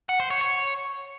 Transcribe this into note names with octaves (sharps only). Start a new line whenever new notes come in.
F#5
C5
C#5
C#5